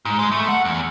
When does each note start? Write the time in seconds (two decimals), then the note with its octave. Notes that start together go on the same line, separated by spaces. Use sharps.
0.05 G#2
0.19 G#3
0.32 A3
0.49 F#5
0.65 E2